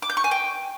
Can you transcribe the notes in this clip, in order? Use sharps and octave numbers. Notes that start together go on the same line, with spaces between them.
D6
G6
C#6
G#5
G5